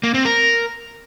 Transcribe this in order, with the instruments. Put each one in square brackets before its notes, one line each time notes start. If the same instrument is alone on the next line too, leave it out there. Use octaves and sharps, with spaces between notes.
[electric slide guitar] A#3
C4
A#4